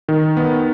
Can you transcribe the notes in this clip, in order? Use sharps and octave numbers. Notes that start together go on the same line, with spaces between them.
D#3
B3